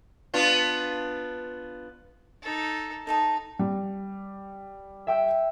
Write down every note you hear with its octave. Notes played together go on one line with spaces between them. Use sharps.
B3 D4 F4
D#4 A4
D#4 A4 D#5 A5
G3
E5 G5 E6